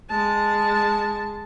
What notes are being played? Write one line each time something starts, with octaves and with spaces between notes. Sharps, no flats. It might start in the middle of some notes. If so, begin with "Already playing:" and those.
G#3 A5